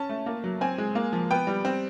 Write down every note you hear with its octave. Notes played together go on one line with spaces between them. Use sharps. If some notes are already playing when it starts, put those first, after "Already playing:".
Already playing: C#4 A5
A3
A#3
F#3
C4 G#5
G#3
A#3
F3
B3 G5
G3
C4